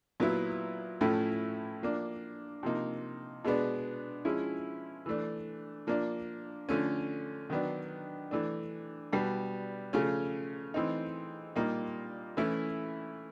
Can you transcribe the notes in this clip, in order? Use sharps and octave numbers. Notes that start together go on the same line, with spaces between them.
A#2 F#3 B3 E4
A2 F3 A3 C#4 E4
F3 A#3 D4
C3 F3 A#3 D#4
B2 G#3 B3 D4
F3 G#3 C#4 E4
E3 A3 D4
F3 A#3 D4
D3 F3 A3 C#4
D#3 F#3 B3 D4
E3 A3 D4
B2 G3 B3
C#3 F3 A3 C#4
E3 A3 C4 D#4
A#2 G3 A#3 D#4
E3 A3 C#4 E4